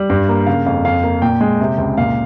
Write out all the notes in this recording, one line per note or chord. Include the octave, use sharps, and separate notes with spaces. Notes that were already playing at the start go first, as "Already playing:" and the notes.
Already playing: G3
G2
A#3
C#3 F5
F2 F5
F2 F5
A#3
A#2 G5
G#3
C3
C#2
A#2 F5